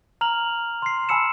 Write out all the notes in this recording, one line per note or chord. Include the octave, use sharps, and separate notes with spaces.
A#5 F6 F7 F#7
C6 C7
G#5 A5 B5 E6 C#7 E7